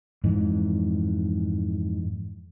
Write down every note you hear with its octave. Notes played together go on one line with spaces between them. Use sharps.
F2 G#2 E3